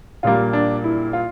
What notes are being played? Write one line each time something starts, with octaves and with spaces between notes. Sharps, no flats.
A#1 A#2 G3 A#3 F4
D4
E4
F4